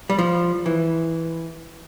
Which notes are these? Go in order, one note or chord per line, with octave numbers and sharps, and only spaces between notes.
G3
F3
E3